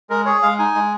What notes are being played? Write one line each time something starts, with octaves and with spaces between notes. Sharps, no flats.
G#3 A#4
G#4 C#5
G#3 F5
D#4 G#5
G#3